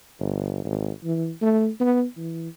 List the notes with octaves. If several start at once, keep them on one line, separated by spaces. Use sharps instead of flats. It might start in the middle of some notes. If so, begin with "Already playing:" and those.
G1
G#1
E3
A3
B3
E3